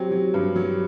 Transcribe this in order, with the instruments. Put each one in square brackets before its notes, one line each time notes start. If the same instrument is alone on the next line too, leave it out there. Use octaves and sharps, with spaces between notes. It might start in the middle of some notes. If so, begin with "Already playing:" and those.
Already playing: [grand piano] F#3 C4 [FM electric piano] G4
[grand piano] F#3
G2
F#3